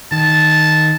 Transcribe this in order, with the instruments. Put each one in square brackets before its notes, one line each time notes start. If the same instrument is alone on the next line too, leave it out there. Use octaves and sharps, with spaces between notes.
[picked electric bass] D#3 [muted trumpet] A5